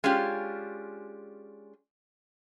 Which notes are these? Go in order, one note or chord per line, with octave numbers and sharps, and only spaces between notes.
G#3 C#4 D4 F4 G4